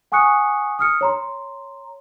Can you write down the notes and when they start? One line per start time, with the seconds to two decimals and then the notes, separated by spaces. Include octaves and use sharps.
0.12 F#5 G#5 C#6 D#6 F#6 C#7
0.79 D#6 F6 C#7
1.01 C#5 A#5 C6